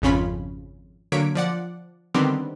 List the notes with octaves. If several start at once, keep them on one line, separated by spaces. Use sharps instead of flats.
G#1 F2 C#3 C#4 F4 B5
D3 F#3 A#3 C#5 B6 D7
F3 D5 F#5
D3 D#3 G3 B3 C4 G4